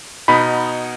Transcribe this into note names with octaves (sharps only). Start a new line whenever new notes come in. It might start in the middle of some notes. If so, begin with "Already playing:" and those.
B2 B3 D#4 B5